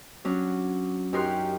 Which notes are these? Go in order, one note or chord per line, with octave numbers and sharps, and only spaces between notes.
F#3 C#4 D4
F#2 D#4 G4 A#4 C6 F#6